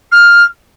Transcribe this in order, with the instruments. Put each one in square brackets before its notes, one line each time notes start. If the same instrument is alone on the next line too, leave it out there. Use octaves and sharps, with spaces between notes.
[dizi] F6